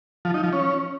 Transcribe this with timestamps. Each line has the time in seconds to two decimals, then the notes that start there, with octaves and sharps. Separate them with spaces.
0.25 F3
0.34 D#4
0.43 F3
0.53 C#4